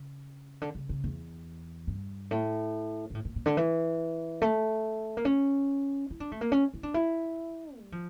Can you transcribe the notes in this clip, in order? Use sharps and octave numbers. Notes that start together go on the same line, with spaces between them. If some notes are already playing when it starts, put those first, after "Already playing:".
Already playing: C#3
D3
C#3
C#3
E2
G2
A2
A#2
A2
A#2
A#2
D3
E3
A3
A#3
C#4
E4
D4
A3
A#3
C#4
E4
D4
E4
G3
F3